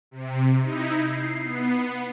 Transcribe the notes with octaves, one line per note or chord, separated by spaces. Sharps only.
C3
D#4 E4
C7
B3